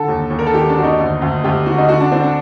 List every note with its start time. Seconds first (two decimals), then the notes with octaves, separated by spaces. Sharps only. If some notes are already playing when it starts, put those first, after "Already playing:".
Already playing: D3 A4
0.08 D#2
0.30 D#2
0.39 A#4
0.46 A4
0.53 D#3 G4
0.69 D4
0.75 D#2 F#4
0.83 D#4
0.99 D2
1.22 D2
1.44 D2 G4
1.66 D3 F#4
1.78 D#4
1.89 D3 F#4
2.00 D4
2.12 D3 C4
2.23 D4